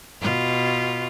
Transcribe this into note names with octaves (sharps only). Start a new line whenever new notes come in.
B2 F4